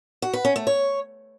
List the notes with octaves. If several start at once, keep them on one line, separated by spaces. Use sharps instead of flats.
F#4
B4
C#4
A3
C#5